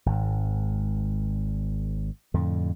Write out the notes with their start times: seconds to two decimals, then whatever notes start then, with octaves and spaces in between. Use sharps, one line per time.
0.06 G#1 G#2
2.34 F2 A2 D3